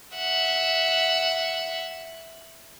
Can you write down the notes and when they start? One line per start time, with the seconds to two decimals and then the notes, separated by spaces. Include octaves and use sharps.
0.15 E5 F#5